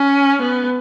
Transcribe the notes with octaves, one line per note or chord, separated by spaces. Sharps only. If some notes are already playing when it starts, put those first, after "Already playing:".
Already playing: C#4
B3